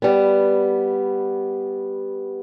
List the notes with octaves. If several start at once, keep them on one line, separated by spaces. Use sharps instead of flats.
G3 B3